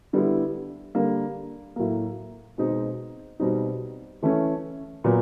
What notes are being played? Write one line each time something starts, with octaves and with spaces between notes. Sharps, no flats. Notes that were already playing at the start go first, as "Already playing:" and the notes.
D3 G3 B3 E4
D3 G3 A#3
A2 F#3 A#3
B2 G#3 C4 D#4
B2 G3 C4 D#4
E3 A3 C#4
A#2 F#3 B3